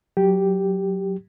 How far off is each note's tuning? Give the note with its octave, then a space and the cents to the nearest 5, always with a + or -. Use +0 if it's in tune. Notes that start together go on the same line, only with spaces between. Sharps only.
F#3 +0 G4 +0